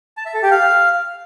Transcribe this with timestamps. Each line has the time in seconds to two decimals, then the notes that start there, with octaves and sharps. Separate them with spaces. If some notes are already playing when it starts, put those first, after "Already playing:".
0.17 A5
0.26 E5
0.34 A4
0.43 G4
0.51 F5